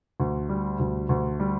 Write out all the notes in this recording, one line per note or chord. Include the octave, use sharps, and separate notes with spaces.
D2
G3
D2
D2
G3